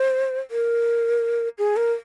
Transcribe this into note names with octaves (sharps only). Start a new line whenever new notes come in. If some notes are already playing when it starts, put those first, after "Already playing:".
Already playing: C5
A#4
G#4
A#4